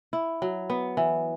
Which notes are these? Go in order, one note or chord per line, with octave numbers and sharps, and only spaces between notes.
E4
F#3
B3
E3